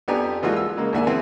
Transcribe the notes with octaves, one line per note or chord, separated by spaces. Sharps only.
F2 B3 D4 G4 G#5 A#5
E3 F3 G#3 A#3 F4 F#4
E6
C#3 G#3 A#3
D#2 A#3 D4 E5 F#5 G#5
E3 C4 E4 G#4